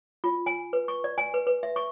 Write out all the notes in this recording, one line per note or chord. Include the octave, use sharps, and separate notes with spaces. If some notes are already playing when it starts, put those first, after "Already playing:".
F4
G#5
B4
C#6
D5
G#5
B4
B4
E5
C#6